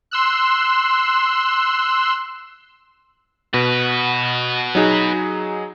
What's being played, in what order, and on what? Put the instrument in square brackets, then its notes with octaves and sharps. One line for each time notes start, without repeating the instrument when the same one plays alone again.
[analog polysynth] C6 E6 F#6
[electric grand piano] B2 [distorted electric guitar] F#4 B4
[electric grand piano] F#3 D#4 G#4